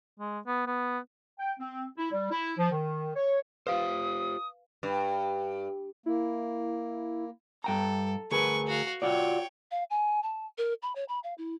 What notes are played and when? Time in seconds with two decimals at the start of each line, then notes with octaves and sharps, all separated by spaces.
0.19 G#3
0.47 B3
0.67 B3
1.39 G5
1.60 C4
1.98 E4
2.12 G3
2.31 E4
2.58 F3
2.72 D#3
3.16 C#5
3.67 F4 G4 B4 C5 F5 D#6
4.83 G2
6.06 A#3 E4
7.64 G2 A4 G5 A#5
8.32 D2 G#4 A#4 B4 C#6
8.67 F#4 F5
9.02 F4 F#4 C#5 D5 G5
9.71 F5
9.90 G#5
10.23 A5
10.58 A#4
10.82 B5
10.96 C#5
11.09 B5
11.24 F5
11.38 E4